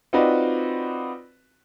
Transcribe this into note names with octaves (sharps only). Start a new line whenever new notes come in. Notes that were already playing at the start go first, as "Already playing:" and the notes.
C4 D#4 F4 F#4 B4 D5